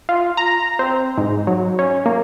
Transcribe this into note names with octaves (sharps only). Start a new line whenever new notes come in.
F4
A#5
C4
G#2
F#3
C#4
A#3